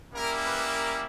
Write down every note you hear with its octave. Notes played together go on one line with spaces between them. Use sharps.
G3 A#3 C#4 E4 A#4
B4
A#4